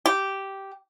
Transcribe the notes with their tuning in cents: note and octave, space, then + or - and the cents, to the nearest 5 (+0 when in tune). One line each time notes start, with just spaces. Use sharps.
G4 -10